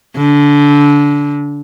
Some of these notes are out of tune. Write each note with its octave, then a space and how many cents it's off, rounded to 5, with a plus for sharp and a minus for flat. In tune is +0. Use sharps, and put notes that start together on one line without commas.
D3 -25